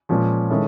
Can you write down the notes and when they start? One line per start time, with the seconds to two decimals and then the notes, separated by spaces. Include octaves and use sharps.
0.09 A#2 F3 G#3 C#4
0.50 D#3 G#3 C#4 E4 A4